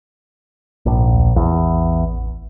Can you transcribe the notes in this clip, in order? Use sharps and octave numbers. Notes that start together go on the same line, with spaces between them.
A#1 G#2
D2
A1 E2